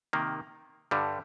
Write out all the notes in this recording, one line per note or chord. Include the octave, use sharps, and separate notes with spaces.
C3 D#3 A#3
G2 D3 G3